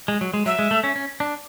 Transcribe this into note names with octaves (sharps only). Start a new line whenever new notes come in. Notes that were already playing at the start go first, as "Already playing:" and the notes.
G#3
F#3
G#3
F#3 E5
G#3
A3
C#4
C#4
D4